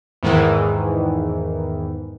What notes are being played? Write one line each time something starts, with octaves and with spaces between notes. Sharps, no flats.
E2 G#2 D#3 E3